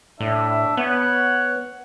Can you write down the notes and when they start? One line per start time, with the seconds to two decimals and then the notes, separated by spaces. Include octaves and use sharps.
0.20 A2 D4 E5
0.77 B3 C#5 F#5